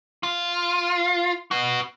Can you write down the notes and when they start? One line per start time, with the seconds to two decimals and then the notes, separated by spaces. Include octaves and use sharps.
0.23 F4
1.51 B3 F#4